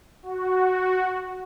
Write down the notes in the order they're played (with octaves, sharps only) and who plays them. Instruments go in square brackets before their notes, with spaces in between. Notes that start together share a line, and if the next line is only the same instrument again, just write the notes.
[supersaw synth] F#4